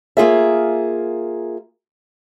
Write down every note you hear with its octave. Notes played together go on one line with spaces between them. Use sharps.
A#3 F4 G#4 E5